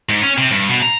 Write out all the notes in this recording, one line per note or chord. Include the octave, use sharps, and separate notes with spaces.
G#2
C#4
C3
G2
B2
A#5